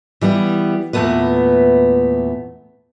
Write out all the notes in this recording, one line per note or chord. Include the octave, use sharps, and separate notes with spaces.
E3 G3 B3 G4
E2 A#2 E3 A3 B3 B4